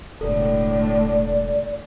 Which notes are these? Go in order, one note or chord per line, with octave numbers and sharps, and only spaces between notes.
E1 A2 D3 A4 D5